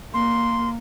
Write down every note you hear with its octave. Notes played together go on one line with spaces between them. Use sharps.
A#3 C6